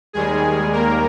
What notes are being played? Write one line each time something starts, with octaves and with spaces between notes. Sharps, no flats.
D#2 D#3 G3 G#3 G#4
A#3 A#4